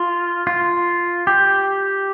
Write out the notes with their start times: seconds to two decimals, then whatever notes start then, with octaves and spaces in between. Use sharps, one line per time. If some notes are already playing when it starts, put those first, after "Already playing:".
Already playing: F4
0.47 F4
1.27 G4